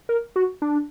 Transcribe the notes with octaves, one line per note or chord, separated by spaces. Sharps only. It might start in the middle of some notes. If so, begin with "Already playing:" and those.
A#4
F#4
D4